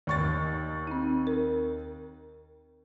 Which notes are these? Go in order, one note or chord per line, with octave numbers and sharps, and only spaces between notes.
D#2 C#6 A6
C4 D#4
A#4